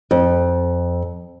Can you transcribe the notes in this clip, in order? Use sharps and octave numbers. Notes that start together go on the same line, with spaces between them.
F2